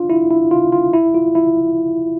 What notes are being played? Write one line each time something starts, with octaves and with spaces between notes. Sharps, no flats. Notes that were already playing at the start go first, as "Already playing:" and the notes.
Already playing: D4 F4
E4
E4
F4
F4
E4
F4
E4